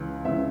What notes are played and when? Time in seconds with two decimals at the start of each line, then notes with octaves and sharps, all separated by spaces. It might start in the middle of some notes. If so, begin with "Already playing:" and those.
Already playing: C#2 C#3 E3
0.25 C#2 C#3 E3 E5